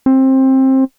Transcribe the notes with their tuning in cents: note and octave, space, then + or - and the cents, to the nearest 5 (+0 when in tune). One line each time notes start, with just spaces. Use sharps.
C4 +20